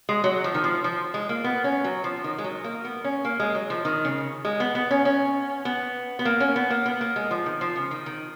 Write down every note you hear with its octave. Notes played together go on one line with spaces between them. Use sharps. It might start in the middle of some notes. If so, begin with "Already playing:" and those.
G#3
F#3
F3
D#3
F3
F3
G#3
A#3
B3
C#4
F#3
F3
D#3
G#3
F#3
A#3
B3
C#4
A#3
G#3
F#3
F3
D#3
C#3
G#3
B3
B3
C#4
C#4
B3
B3
A#3
C#4
B3
A#3
B3
A#3
G#3
F3
D#3
F3
C#3
D#3
D#3